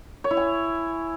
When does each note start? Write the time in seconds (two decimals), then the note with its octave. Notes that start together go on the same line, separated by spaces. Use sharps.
0.24 C#5
0.31 E4
0.37 G#5